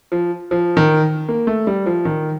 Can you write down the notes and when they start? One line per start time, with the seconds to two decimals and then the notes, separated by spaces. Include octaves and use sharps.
0.12 F3
0.51 F3
0.77 D#3
1.29 A#3
1.47 A3
1.67 G3
1.86 F3
2.05 D#3